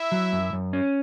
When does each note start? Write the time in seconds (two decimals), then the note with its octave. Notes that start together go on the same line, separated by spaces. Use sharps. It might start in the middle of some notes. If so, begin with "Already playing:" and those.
Already playing: E4 E5
0.12 F#3
0.33 F#2
0.53 F#2
0.73 C#4